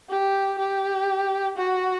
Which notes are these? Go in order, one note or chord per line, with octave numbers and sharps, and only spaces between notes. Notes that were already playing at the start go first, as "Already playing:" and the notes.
G4
G4
F#4